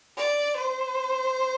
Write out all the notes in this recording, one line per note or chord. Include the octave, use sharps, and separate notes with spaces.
D5
C5